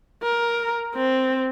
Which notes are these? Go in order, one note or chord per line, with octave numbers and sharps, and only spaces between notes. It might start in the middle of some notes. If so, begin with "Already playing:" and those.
A#4
C4